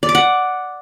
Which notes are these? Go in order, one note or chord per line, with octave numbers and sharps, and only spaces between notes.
D5
D6
F#5